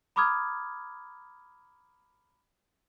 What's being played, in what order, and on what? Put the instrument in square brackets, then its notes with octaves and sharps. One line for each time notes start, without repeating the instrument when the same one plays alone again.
[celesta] A#5 B5 D6 D#6 F6 G#6